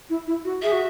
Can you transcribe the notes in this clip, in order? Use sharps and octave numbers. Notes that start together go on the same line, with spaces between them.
E4
E4
F#4
G#4 E5
F#4